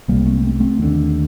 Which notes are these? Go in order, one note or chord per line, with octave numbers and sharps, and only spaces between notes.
C2 C3 G3 A#3
A3 C4
A3 C4
A3 C4
D#2 D3